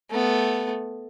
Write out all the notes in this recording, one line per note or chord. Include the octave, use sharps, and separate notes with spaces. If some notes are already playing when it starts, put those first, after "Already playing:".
A3 B3